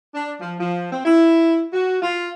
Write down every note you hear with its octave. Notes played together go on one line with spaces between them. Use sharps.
D4
F3
F3
C4
E4
F#4
F4